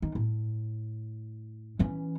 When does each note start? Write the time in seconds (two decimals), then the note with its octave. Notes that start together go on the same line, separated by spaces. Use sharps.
0.02 D#3
0.15 A2
1.79 E3 C#4